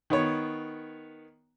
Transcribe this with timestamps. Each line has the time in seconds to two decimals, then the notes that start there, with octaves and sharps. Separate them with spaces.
0.10 D#3 B3 C#5